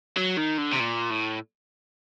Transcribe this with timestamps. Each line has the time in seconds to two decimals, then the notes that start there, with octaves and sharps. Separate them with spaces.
0.18 F#3
0.38 D#3
0.58 D3
0.72 C3
0.80 A#2
1.10 A2